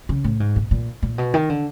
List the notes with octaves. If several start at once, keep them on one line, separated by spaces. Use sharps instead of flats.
C#3
A2
G#2
A#2
A#2
A#2
B2
D#3
D3